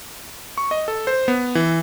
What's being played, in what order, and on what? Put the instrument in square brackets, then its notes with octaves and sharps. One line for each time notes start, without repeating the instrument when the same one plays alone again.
[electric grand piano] C#6
D#5
A4
C5
B3
E3